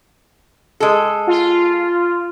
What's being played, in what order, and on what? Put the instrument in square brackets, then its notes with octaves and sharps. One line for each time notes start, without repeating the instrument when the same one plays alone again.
[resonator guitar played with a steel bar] G#3 A4
[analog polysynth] F4